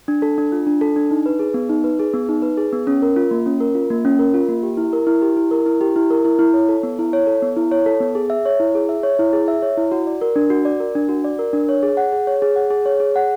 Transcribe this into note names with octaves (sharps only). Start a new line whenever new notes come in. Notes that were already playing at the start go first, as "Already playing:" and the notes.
D4
A4
D4
F4
D4
A4
D4
D#4
B4
G#4
B3
D#4
B4
G#4
B3
D#4
B4
G#4
B3
C#4
A#4
F4
A#3
C#4
A#4
F4
A#3
C#4
A#4
F4
A#3
G4
E4
A#4
E4
G4
E4
A#4
E4
G4
E4
A#4
E4
E4
C#5
A4
B3
E4
C#5
A4
B3
E4
C#5
A4
B3
G#4
E5
C#5
E4
G#4
E5
C#5
E4
G#4
E5
C#5
E4
F#4
D5
A#4
D4
F#4
D5
A#4
D4
F#4
D5
A#4
D4
C#5
G#4
F#5
G#4
C#5
G#4
F#5
G#4
C#5
G#4
F#5